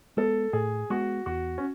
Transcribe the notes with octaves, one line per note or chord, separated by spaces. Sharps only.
G#3 B3 A4
A2 G#4
G#3 B3 F#4
E2 F#4
C#4